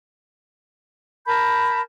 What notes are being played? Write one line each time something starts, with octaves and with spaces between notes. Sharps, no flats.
A#4 A5 B5 G6